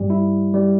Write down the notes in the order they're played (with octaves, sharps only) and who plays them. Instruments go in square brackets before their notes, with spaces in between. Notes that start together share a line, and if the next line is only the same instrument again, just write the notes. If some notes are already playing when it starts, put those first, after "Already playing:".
Already playing: [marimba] G2 [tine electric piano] G3
[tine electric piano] E4
G3